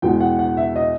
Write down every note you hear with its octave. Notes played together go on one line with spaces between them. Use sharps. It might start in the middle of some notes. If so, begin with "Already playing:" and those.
E2 B2 G#3 G5
F#5
F#5
E5
D#5